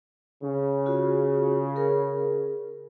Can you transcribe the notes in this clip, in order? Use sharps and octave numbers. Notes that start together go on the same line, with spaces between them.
C#3
F4 F#4 G#4
G#4 A#4